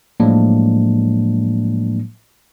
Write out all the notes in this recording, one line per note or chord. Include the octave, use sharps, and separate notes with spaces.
A2 F3 F#3 G#3 A#3 D4